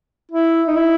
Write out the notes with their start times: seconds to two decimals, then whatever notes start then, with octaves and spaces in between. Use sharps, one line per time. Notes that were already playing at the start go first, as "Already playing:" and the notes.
0.31 E4
0.68 D#4
0.76 E4